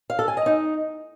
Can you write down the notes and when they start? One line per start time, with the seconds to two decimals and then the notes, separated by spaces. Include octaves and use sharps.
0.10 F5
0.19 A4
0.28 G#5
0.37 D#5
0.46 D#4